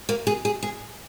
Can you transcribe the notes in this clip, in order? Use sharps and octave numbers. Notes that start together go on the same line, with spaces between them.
A#3
G#4
G#4
G#4